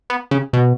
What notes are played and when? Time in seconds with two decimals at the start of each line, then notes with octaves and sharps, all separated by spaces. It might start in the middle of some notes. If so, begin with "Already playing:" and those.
0.10 B3
0.31 C#3
0.53 B2